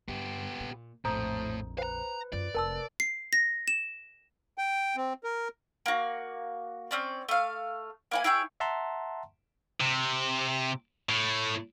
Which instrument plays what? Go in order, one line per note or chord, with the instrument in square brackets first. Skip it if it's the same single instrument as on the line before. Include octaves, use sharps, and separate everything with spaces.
[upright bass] G2 [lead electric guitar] B3 G4
[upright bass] A#2
[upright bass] A#1 F2 [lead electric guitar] A2 [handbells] C5 D#6 [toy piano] A#5
[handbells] B4 [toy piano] C5 [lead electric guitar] F5 A#5
[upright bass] F#2 F4 [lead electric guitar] D5
[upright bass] F1 [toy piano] A#4 A5 E6
[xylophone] C7
A#6
E7
[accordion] G5
C4
A#4
[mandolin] A#3 F#4
C4 C#4 D5
A3 F5
A#3 E4 G#5
E4 G#4 C#5 G5
[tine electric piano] E5 F#5 A5 A#5 C6
[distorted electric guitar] C3
A2